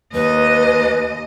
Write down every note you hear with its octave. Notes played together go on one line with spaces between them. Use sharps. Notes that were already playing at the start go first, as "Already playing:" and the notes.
D#2 B4 D#5